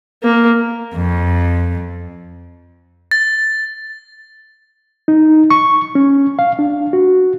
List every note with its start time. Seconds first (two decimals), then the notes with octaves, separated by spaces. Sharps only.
0.23 A#3
0.95 F2
3.11 A6
5.08 D#4
5.50 C#6
5.95 C#4
6.39 F5
6.59 D4
6.93 F#4